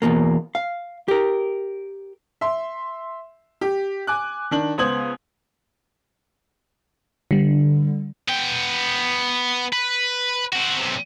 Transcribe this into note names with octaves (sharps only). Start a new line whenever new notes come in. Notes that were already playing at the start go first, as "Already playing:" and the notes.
E2 G2 B2 A#3
F5
G4 A#4
E5 C6
G4
G#5 D6 F#6
D#3 D4 F#7
C#2 B3 C5 D#6 G#6 F#7
D3 G3
B3 G5
B4
C4 F#4
B1 C3